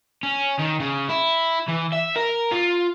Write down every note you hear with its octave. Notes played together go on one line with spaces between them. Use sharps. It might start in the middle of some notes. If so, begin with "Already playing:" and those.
C#4
D#3
C#3
E4
E3
E5
A#4
F4